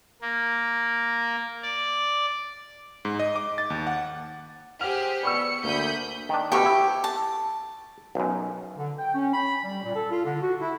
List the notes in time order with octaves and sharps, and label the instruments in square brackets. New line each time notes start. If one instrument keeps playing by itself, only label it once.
[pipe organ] A#3
D5
[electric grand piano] G#2
D#5
D6
A6
D#2
F#5
[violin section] G4 G#4 C5 [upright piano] F#5 F6 F7
[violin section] B3 C#7 [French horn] D5 [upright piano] B5 C#6 E6
[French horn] D2 [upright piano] A#3 [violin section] B5 D#6 G6
[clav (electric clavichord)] D#3 D4
[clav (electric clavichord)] D2 B2 [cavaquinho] G4 C#6
[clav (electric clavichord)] E4
[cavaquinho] A5
[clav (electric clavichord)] B1 F#2
[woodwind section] D3
G5
C#4
B5
G3
A#2
A4
F4
D3
F#4
E4